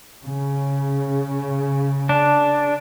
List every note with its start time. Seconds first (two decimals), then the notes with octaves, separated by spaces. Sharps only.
0.24 C#3
2.09 D4